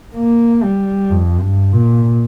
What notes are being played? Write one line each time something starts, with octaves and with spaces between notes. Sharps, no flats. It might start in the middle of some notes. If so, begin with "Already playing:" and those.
A#3
G3
F2
G2
A#2